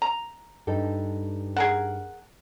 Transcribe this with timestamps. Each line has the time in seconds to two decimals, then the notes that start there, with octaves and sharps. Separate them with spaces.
0.02 A#5
0.67 G2 D#4 A4
1.56 G#4 A#4 F#5